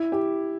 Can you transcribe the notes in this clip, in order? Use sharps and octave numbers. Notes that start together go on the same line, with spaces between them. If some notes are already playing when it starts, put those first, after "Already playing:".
Already playing: E4
G4